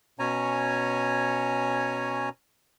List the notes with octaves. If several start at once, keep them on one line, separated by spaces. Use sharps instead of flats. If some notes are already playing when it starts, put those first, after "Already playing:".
B2 C#4 C#5 G#5 A#5